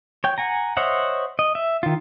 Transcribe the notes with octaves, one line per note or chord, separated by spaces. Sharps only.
C#5 G5
F#5 G#5 A#5
C5 C#5 D#5 E5 F#5
D#5
E5
D#3 F4